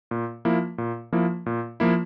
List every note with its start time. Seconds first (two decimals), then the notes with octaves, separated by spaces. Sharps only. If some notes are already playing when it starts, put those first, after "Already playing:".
0.11 A#2
0.45 F3 A#3 E4
0.78 A#2
1.13 F3 A#3 E4
1.46 A#2
1.80 F3 A#3 E4